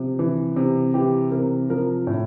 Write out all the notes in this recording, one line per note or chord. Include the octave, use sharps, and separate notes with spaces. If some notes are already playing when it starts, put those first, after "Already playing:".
Already playing: C3 F3
E3
C3
E3 G4
C3 A#4
F3 A#4
A2